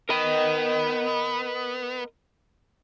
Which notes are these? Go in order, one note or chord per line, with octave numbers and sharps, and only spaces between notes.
B3 A#4 D#5